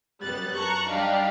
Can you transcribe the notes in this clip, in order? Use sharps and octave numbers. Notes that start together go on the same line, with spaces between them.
F#2 G3 B3 F#6 A6
A5 A#5 C#6 F#6
G3 D4 D#4 G4 F5